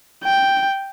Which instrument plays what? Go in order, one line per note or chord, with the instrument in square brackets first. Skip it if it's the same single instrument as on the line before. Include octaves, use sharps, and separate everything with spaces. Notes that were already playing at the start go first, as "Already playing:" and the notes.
[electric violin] G5